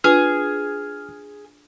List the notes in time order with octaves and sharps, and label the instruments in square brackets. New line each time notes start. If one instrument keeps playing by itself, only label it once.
[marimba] D4 F4 B4 [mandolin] G#4 [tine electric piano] F6